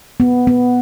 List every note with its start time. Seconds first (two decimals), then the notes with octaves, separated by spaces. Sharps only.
0.20 B3
0.47 B3